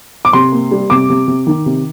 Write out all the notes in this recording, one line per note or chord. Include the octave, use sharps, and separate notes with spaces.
D6
C3 C6
A#3
G3
C3 D6
C3
C3
D#3
C3